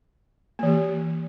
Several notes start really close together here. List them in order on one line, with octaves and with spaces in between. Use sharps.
A#3 E3 G4